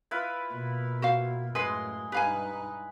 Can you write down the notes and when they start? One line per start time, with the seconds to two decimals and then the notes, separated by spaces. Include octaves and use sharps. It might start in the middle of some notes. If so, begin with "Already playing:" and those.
0.11 E4 F4 B4
0.50 B2 A#3
1.02 F#4 C5 F5
1.55 F#2 A2 G#3 B4 C6
2.12 G2 D#4 G4 B4 F5 G#5